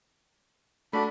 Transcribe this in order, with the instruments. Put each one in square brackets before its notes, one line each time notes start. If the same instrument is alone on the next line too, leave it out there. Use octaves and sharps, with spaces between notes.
[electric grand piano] A3 F#4 D5 [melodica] D4 B5